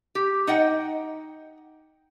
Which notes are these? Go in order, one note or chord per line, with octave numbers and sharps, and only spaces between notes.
G4
D#4 D#5 F#5 G5